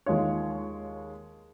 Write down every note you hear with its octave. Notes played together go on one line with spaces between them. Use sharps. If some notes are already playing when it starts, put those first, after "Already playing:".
D#2 G#3 F4 C#5